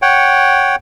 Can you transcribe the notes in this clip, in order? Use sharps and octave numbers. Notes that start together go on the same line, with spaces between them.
C#5 F#5 G5